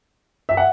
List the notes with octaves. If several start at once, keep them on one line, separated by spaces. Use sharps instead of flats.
E5
F#5